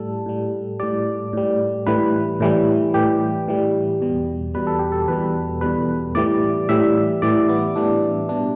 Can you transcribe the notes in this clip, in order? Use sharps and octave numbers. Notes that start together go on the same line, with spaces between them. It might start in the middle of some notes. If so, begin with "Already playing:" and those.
Already playing: A2 G3 A4
A2 G3
A2 G3 D5
A2 G3
A2 E3 G3 B4
A2 E3 G3
A2 E3 G3 G4
A2 E3 G3
E2 B2 G3
E2 B2 G3 B4
A4
G4
A4
E2 B2 G3 B4
E2 B2 G3 B4
A2 E3 G3 D5
A2 E3 G3 E5
A2 E3 G3 D5
B3
A2 E3 G3 D4
B2 G3 D4